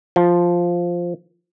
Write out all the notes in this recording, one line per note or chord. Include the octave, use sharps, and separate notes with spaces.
F3